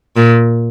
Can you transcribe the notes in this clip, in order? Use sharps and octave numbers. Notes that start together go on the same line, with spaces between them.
A#2